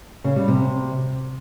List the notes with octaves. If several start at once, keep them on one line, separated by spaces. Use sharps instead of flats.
C#3
G3
C3